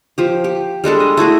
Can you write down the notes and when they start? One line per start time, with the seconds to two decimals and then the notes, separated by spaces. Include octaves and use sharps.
0.18 F3 G4
0.44 G4
0.84 G3 G#3 D4 A4
1.00 D#5
1.17 A3 E4 F#4 G#4